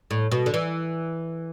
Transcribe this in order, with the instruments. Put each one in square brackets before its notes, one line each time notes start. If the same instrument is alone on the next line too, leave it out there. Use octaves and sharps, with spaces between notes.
[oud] A2
B2
D3
E3